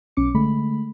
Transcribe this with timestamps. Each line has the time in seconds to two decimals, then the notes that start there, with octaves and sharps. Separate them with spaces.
0.17 B1 C#4 D6 C#7
0.34 D3 G#3 A3 B5